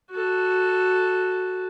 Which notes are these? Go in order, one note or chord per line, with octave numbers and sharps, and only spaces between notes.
F#4 A4